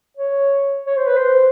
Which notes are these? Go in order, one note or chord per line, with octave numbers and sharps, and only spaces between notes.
C#5
C#5
C5
B4
C5